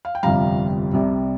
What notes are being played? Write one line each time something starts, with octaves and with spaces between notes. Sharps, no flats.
F5
G5
G1 F2 C3 G3 F5 A#5
C2 C3 G3